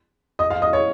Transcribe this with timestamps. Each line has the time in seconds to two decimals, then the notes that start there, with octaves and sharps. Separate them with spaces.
0.39 D#5
0.50 F5
0.62 D#5
0.73 C#5